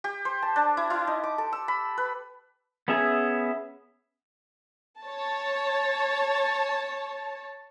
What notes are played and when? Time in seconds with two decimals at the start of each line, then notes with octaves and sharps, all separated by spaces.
0.04 G4
0.25 C5
0.42 A5
0.56 D4
0.77 E4
0.90 E4
1.07 D#4
1.23 D6
1.38 A4
1.53 E6
1.68 B5
1.98 B4
2.88 B3 C#4 G#4 E5 G#5
5.02 C#5 A5